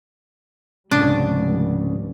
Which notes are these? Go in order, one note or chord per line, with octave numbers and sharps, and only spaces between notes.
F1 C#2 G#2 C#3 G3 D4